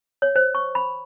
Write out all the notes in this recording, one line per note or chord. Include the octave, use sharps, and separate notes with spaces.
C#5
C5
C#6
B5